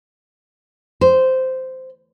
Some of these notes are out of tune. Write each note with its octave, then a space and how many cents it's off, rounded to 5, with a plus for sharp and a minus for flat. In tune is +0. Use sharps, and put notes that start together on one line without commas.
C5 -10